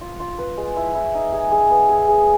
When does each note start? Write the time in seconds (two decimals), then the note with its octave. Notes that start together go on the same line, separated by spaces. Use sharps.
0.01 F4
0.20 F4
0.38 B4
0.57 G#3
0.76 E4
0.95 E4
1.14 D#4
1.33 G#4
1.52 G#4
1.71 B3
1.89 G#4
2.08 G#4